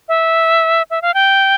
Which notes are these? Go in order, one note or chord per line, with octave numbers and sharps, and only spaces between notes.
E5
E5
F5
G5